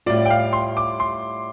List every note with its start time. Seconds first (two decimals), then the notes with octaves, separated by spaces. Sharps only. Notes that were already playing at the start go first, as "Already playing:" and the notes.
0.06 A2 G3 F4 D5
0.26 G5
0.30 F5
0.53 C6
0.77 D6
1.00 C6